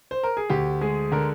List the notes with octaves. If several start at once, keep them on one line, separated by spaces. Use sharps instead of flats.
C5
A#4
G#4
D2 G4
G#3 G#4
D3 A#4